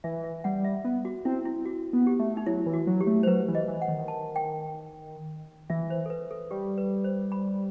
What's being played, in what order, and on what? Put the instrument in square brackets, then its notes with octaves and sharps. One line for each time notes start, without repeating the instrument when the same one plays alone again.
[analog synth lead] E3 [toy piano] E5
[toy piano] E5
[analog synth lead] G3 [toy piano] F#5
[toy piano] E5
[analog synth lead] B3
[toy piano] F#4
[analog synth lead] C4 [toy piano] E4
[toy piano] E4
F#4
[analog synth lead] B3
[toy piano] G4
[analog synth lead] A3
[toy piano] D#4
[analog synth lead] F#3 [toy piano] E4
[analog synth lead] E3
[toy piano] F#4
[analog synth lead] F#3
[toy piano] G4
[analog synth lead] A3
[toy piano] C5
[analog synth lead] F#3 [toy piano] B4
[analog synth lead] E3
[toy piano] D#5
[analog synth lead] E3
[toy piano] F#5
[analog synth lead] D#3
[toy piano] A5
G5
[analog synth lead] E3 [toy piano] E5
[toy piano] C5
A4
B4
A4
[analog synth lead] G3 [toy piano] G4
[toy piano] B4
C5
B5